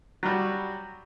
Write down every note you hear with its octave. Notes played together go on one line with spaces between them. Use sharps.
F#3 G3 F#4